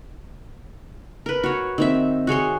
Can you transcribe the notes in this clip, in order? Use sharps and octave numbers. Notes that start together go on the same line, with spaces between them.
A#4 B4
F#4 C#5
D#3 C4 E5
F#4 G#4 C#5 C6